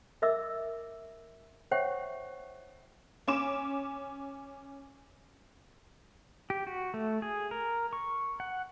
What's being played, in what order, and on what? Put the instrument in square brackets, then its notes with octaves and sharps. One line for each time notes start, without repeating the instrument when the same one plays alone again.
[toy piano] A#4 D#5 E5 D6 E6
C5 C#5 E5 F#5 G5 C#6
[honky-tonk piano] C#4 D6 E7
[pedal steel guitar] G4
F#4
A3
G#4
A#4
C#6
F#5